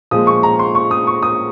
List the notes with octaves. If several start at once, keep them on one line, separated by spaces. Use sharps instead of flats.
A#2 F3 G#3 D#6
C#6
A#5
C6
C#6
D#6
C#6
D#6